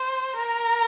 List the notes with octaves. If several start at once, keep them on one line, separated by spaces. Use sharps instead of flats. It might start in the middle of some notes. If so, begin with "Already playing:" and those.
Already playing: C5
A#4